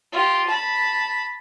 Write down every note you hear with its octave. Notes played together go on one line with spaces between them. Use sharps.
F4 G4
A5 B5